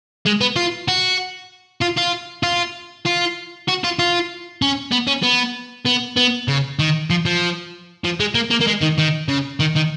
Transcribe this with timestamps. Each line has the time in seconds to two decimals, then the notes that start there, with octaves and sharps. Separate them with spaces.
0.26 G#3
0.41 B3
0.56 F4
0.88 F#4
1.81 F4
1.97 F4
2.43 F4
3.06 F4
3.68 F#4
3.84 F4
3.99 F4
4.62 C#4
4.92 B3
5.08 C#4
5.23 B3
5.86 B3
6.17 B3
6.48 C#3
6.79 D#3
7.10 F3
7.25 F3
8.04 F3
8.20 G#3
8.35 A#3
8.50 A#3
8.61 A#3
8.67 G#3
8.81 D#3
8.98 D#3
9.29 C#3
9.60 D#3
9.76 D#3